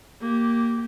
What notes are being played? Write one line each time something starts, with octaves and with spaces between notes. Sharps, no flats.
A#3 G4